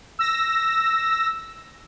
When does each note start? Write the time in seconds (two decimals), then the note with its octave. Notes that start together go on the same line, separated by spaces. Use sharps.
0.19 E6 A#6